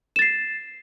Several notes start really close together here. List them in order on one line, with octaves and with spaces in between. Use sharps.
E7 A6 C7